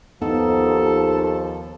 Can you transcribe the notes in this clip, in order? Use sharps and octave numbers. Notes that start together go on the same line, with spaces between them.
D#2 F3 B3 D#4 A4